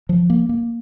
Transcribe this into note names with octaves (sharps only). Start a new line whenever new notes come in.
F3
A#3
A#3